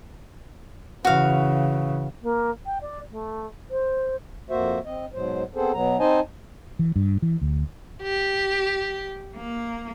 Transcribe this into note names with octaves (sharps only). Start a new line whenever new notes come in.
C#3 E3 F#4 F5
A#3
G5
D5
A3
C5
F2 A#3 F#4 C5 E5
C4 D#5
G#2 B2 F#3 C5
B3 C4 G#4 A4 C5
B2 F#3 B3 A#5
C4 D#4 C5 D#5 G#5 A5
E3
G2
E3
D2
G4
A#3